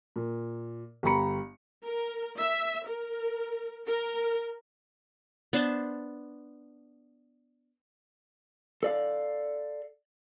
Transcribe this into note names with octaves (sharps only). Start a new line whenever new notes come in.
A#2
G1 G2 G4 A#5 B5 C#7
A#4
E5
A#4
A#4
B3 D4 C5 A5
A4 D5 F5